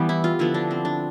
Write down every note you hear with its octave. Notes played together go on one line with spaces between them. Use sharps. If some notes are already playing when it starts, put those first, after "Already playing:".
Already playing: E3 G3 B3 G4
E4
F4
D3 F3 B3 E4
D4
C4
D4